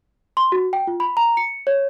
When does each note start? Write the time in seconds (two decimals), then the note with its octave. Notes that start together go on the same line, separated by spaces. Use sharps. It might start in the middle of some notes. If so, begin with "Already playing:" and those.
0.37 C6
0.52 F#4
0.73 G5
0.87 F4
1.00 B5
1.17 A#5
1.37 C#7
1.67 C#5